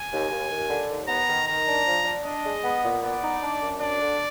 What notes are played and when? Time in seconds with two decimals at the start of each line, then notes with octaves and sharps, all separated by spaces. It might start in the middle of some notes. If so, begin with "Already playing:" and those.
Already playing: G#5
0.11 D#2
0.31 D#2
0.50 D#2
0.70 D3
0.89 D#2
1.08 B3 A#5
1.28 D#3
1.47 D#3 A#5
1.67 D4
1.86 F3
2.05 D4
2.25 D4 D#5
2.45 G#3
2.64 B3
2.84 A#2
3.02 B3 D5
3.23 D#4
3.41 D4
3.61 F#2
3.80 D4 D5
4.00 D3